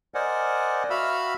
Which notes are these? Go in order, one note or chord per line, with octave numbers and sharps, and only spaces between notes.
A#4 C5 D5 D#5 F#5 G#5
F#4 E5 F5 B5 E6 F6